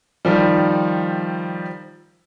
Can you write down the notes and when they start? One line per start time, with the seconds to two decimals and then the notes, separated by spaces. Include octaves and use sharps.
0.25 D#3 F3 G3